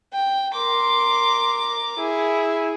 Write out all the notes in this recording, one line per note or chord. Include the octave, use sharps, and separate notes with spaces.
G5
A#4 C6 D6
E4 G#4